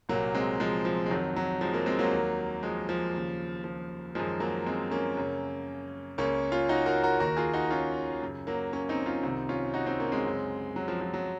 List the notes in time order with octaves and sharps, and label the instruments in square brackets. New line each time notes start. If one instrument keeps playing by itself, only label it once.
[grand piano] C2 A#2 F#3 A#3
G#3 C4
F3 G#3
F3
G#3
F2 D#3 F#3
F#3
F3 G#3
F#3 A#3
G#3 C4
F#3 A#3
D#2 D#3
F3 G#3
F3
D#2 C#3
F3
F#2 D#3 F3 G#3
F#3 A#3
G#3 C4
A#3 C#4
F#2 C#3
C#2 C#3 A#3 C#4
C#4 F4
D#4 F#4
F#4 A#4
F#4 A#4
D#2 D#3 F#4 A#4
F4 G#4
D#4 F#4
C#4 F4
F#2 C#3
F#3 A#3
A#3 C#4
C4 D#4
C#4 F4
C2 C3 D#3 C4 D#4
C#4 F4
D#4 F#4
C4 D#4
A#3 C#4
G#3 C4
F#2 C#3
F#3
F3
F3
F#3